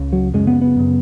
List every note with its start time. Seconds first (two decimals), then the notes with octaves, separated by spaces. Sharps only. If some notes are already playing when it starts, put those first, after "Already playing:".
Already playing: C#2 C#3
0.13 F#3
0.34 F#2 C#3 G#3
0.47 B3
0.62 B3
0.76 F#2 C#3